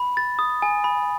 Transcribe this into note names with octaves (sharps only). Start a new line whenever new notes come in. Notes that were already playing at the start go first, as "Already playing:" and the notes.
Already playing: B5
A6
D#6
G#5
B5